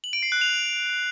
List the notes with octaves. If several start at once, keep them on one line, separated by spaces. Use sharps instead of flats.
F#7
D7
C7
F#6
F7